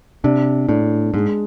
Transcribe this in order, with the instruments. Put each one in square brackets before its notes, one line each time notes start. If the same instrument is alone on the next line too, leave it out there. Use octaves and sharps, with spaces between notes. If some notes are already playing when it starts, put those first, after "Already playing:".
[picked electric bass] C3 [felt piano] D4
[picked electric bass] A2 [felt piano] D4
[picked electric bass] G#2 [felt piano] G#3